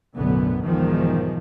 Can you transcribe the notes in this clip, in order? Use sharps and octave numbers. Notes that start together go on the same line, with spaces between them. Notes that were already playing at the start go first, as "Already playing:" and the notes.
B1 F#2 A2 D3 B3
B1 E2 G#2 D#3 F3